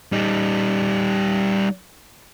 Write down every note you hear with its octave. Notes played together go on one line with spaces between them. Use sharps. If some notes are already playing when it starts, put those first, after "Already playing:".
G3 D#4